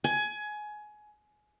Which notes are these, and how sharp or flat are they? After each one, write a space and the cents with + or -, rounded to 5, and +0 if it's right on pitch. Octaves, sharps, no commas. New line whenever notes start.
G#5 +20